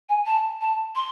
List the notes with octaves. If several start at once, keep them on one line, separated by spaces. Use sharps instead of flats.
G#5
A5
A5
C6